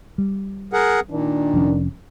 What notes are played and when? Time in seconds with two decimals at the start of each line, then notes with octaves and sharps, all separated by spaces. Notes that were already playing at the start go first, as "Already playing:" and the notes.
0.18 G3
0.73 G#4 A#4 F#5
1.11 A#2 D#3 D4
1.54 F1 F2 C#4